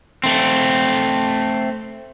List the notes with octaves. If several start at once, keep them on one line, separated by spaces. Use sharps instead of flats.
A3 C4